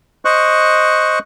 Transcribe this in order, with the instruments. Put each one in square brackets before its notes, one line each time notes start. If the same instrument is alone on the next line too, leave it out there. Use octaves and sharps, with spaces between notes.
[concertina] C5 D#5 C#6 F#6